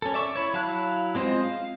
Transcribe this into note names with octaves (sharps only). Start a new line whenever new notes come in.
C#4 A4
D5 E5 C#6
E4 C#5
F#3 E4 F5 A5 F#6
G#3 C4 F4 C5 D#5
F5